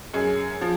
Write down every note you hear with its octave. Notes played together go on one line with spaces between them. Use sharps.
F#2 G#4
F3